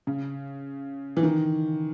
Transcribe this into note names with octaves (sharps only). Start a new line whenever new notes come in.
C#3
E3
D#3